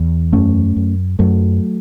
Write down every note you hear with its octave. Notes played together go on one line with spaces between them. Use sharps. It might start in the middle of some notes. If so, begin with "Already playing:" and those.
Already playing: E2
F#2 A3 C#4
F#2
F#2 F#3 A3